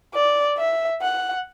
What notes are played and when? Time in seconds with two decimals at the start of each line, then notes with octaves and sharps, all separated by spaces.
0.14 D5
0.57 E5
1.02 F#5